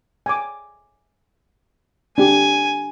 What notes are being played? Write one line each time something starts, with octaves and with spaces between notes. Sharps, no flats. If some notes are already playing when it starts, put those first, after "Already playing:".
G#5 D6
D4 G4 G#5